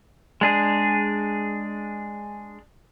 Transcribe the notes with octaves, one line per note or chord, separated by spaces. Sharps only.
G#3 D4 G#4